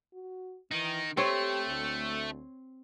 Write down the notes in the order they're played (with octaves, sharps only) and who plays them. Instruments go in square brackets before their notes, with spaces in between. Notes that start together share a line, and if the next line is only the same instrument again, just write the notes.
[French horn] F#4
[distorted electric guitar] D#3 D#4 [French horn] E3
[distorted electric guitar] A3 [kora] C4 C#5 [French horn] G4
[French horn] D2